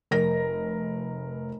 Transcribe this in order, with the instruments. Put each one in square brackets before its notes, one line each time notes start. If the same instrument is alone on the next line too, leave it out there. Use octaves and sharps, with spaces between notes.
[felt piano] F1 A#4 A#6